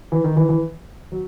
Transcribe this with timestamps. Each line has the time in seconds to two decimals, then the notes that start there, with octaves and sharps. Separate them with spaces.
0.12 E3
0.24 D#3
0.36 E3
0.49 E3
1.12 F#3